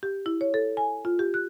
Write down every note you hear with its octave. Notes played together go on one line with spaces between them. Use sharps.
G4
E4
C#5
A4
G#5
F4
G4
F#6